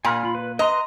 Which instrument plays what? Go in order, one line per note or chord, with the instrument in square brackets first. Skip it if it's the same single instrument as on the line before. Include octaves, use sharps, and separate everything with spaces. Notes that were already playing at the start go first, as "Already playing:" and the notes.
[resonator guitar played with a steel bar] A#2 [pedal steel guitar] G#5 B5 F6
[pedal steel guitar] F4 B5
B4
[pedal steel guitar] B4 A#5 C6 [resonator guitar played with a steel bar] D#5